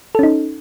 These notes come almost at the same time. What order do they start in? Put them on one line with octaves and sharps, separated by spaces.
A4 C#4 D#4